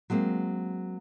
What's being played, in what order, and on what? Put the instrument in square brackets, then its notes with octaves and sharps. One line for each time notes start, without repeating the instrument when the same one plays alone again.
[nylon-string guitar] F#3 G#3 A#3 C4